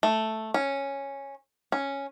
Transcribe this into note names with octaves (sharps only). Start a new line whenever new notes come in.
A3
C#4
C#4